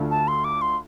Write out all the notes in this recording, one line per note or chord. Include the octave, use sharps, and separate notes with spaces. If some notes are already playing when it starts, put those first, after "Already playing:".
Already playing: D2 D3 A3 D4 F4
A5
C6
D6
C6